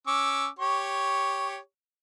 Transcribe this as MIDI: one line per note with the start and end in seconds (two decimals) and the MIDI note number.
0.07 0.47 61
0.07 0.47 86
0.07 0.47 88
0.59 1.58 67
0.59 1.58 73
0.59 1.58 85